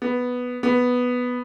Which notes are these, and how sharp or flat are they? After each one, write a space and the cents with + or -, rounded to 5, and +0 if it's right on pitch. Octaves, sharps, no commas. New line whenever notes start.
B3 +0
B3 +0